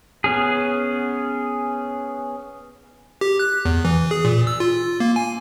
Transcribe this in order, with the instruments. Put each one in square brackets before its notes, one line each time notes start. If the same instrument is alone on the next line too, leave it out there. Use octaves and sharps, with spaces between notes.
[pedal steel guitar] B3 C#4 G#4
[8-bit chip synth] G4
F#6
E2
E3
G#4
A#2
E6
F4
A#3
G#5